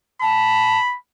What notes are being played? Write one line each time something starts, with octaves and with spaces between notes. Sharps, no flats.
A5 B5